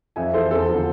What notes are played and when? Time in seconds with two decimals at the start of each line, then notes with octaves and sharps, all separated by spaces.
0.16 F2 E5 G#5
0.34 E3 A4 C5
0.51 E2 A4 C5
0.68 D3 F3